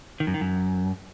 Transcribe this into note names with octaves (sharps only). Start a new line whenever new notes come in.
D#3
F#2
D#3
F#2